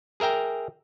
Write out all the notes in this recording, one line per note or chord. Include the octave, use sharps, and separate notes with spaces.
G#4 A#4 E5 G5 A#5